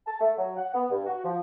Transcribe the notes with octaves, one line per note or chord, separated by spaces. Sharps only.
A5
A3
F#3
F#5
B3
G2
F#4
F3